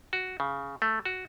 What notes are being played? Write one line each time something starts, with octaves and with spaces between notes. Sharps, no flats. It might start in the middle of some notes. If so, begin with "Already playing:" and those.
F#4
C#3
A3
F#4